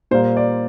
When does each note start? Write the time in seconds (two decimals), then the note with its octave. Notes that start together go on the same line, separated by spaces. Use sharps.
0.11 A#2 G3 A#3 C5
0.37 D5